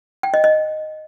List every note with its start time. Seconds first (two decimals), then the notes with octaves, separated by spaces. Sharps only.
0.23 G5
0.34 D#5
0.44 D#5